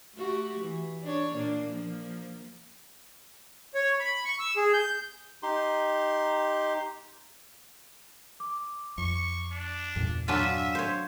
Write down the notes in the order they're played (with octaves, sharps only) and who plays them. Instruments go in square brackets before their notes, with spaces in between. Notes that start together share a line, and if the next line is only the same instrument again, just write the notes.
[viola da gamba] A3 F#4 G4
E3
D4 C#5
A#2 A#3 D4
F3 A#3
[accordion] C#5
B5
C#6
E6
G#4
G6
[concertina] D#4 G4 C6
[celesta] D6
[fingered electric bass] F2 [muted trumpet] C#6
[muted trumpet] D4
[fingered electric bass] E2 G2 A#2
[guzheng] F#3 D4 F4 [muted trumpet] E5 [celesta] G#5 D#7
[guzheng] C5 C#5